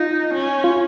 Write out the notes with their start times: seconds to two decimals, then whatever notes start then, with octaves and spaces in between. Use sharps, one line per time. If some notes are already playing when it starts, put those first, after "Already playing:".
Already playing: D#4 F4
0.33 C#4
0.64 F4